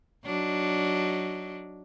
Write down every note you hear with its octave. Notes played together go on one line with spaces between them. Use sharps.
F#3 D4 D#4